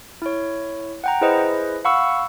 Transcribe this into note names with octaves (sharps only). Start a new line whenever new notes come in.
E4 C#5
F#5 G5 A#5
E4 G#4 B4 C5 D#5
F5 F#5 B5 C#6 E6